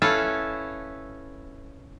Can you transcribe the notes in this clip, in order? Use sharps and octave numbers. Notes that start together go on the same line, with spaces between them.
C#4 E4 A4 B4 F5